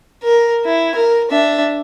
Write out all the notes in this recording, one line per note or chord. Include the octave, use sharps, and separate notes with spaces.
A#4
E4
A#4
D4 E5